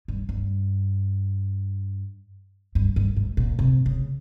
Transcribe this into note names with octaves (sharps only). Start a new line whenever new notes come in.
G2
G2
G2
G2
G#2
A#2
C3
C#3